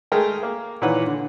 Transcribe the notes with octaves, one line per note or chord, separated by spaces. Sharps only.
G#3 A3 A#4 G5
A#3
A#2 D#3 E3 B4 C#5 F#5
D3